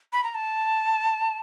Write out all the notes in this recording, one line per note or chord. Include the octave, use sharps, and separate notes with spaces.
B5
A#5
A5